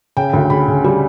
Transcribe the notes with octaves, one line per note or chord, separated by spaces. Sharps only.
C#3 G5
D2
C#3 B5
C#3
G3